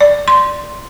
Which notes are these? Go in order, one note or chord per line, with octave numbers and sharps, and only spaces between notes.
D5
C6